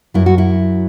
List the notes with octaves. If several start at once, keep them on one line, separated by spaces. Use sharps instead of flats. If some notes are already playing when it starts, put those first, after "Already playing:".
F#2 F#3 E4
F#4
E4